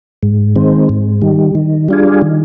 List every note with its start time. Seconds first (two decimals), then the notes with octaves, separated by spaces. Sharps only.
0.23 G#2
0.56 D#3 G#3 C4
0.89 G#2
1.22 D#3 G3
1.55 D#3
1.89 G3 D4 F4 G#4
2.22 D#3